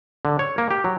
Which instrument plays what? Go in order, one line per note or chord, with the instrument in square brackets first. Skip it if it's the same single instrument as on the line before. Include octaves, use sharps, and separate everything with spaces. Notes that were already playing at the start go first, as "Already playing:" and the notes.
[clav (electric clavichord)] D3
C#5
A#3
G4
F#3